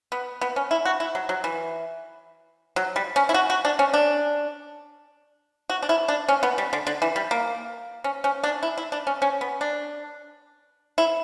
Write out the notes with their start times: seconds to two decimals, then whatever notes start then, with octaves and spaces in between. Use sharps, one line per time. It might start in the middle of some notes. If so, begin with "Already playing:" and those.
0.12 B3
0.41 B3
0.56 C#4
0.71 E4
0.85 F#4
1.00 E4
1.15 F#3
1.29 F#3
1.44 E3
2.76 F#3
2.96 G3
3.16 C#4
3.29 E4
3.34 F#4
3.50 F#4
3.65 D4
3.79 C#4
3.94 D4
5.70 F#4
5.83 D4
5.89 E4
6.08 D4
6.28 C#4
6.43 B3
6.58 G3
6.73 D3
6.87 D3
7.02 E3
7.16 G3
7.31 A#3
8.04 C#4
8.24 C#4
8.43 D4
8.63 E4
8.78 E4
8.92 D4
9.07 C#4
9.22 C#4
9.41 B3
9.61 D4
10.98 E4